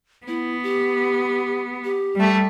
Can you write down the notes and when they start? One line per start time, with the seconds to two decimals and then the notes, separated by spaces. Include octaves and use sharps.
0.28 B3 E4
0.63 G4
1.84 G4
2.16 G3 A3